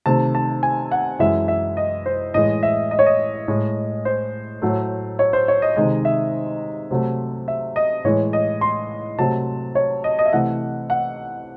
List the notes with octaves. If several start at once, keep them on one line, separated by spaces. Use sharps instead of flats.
C3 D#3 A3 A5
A5
G#5
F#5
F#2 E3 G#3 E5
E5
D#5
C5
A2 E3 G#3 D#5
E5
D#5
C#5
D#5
A2 G#3
C5
A2 F#3 A3
C#5
C5
C#5
D#5
C3 D#3 G#3 D#5
E5
C3 F#3 A3
E5
D#5
A2 E3 G#3 C#5
D#5
C6
C3 F#3 A3 A5
C#5
D#5
D#5
E5
C3 E3 A3 F#5
F#5